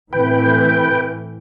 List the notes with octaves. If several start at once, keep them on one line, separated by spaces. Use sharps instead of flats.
A2 E3 C4 B4 G5